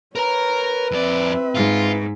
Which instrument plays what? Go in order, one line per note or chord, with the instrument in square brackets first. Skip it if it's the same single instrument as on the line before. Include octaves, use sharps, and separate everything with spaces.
[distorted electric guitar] A#4 A#5 [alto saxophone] B4 [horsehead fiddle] C#5
[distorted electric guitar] F2 D5 [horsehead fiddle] C4 E5
[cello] G#2 [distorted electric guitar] F4